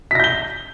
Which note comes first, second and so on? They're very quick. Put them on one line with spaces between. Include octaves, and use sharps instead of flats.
B6 A#6 G6 G7